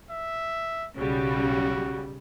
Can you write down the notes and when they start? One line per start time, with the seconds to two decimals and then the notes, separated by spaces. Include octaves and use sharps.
0.10 E5
0.98 B1 C#3 G3 F#4